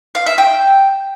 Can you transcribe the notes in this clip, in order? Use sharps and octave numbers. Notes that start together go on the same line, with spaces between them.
F5
E5
G5